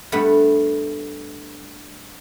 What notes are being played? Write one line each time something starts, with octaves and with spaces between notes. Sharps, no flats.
G2 A3 B3 B5